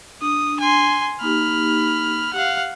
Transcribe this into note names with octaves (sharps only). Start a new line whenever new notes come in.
D4 D#6
G#5 C6
A#3 D#4 G4 B5 F6
G4 F5 F#5